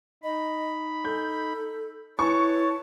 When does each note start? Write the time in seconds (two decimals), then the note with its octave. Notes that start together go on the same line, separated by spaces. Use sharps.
0.23 D#4 D#5 B5
1.05 A4 G6
2.19 E4 B4 C#5 A5 C#6